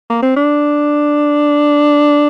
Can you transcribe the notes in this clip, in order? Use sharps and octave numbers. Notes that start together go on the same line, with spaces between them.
A#3
C4
D4